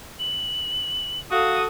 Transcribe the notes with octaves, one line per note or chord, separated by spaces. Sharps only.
F#7
F#4 A4 F5 D#6